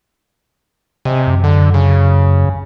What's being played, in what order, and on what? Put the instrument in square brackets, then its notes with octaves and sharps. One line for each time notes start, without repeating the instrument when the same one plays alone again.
[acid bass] C3 [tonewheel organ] D#5 G#5
[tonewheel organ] F#2
[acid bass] D3
C#3